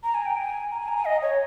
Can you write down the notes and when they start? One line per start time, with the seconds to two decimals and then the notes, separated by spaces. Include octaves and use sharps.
0.04 A#5
0.14 G#5
0.26 G5
0.37 G#5
0.72 A#5
0.80 G#5
0.88 A#5
0.97 G#5
1.05 D#5
1.22 C#5